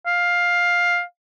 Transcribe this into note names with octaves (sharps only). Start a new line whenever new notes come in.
F5